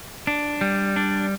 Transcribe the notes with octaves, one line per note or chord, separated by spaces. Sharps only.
D4
G3
D4